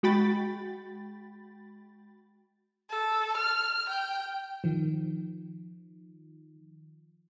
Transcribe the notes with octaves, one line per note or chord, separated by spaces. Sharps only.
G#3 F#4 G5 B5 A6
A4
F6
G5
D#3 F3